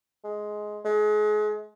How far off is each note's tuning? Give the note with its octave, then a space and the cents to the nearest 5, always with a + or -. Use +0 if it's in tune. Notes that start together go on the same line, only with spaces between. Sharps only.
G#3 +10
G#3 +35